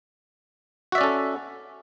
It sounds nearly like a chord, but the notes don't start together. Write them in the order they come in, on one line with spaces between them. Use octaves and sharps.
F#4 E5 D5 C#4 A4